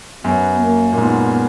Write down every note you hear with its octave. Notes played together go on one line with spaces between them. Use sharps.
F#2 B3
A#3
A#2
G#2 B3